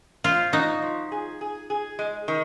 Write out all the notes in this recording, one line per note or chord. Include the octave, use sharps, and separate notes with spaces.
F3 F4
D#4 F#4
F3
G#4
G#4
G#4
G#3
D#3